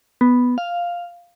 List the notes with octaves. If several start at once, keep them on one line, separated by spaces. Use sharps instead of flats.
B3
F5